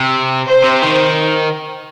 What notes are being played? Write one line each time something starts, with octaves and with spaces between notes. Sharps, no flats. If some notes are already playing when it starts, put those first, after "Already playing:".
Already playing: C3
C5
C3
D#3